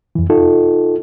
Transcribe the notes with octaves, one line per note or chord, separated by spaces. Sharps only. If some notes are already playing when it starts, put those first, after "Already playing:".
F2 E3
D#4 F4 A4